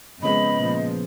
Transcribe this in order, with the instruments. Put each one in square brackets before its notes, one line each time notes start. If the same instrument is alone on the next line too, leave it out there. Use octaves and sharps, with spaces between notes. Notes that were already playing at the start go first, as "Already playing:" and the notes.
[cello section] F2 [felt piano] C#3 G#3 B3 [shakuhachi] D#5 [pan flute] B5
[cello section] A#2 F3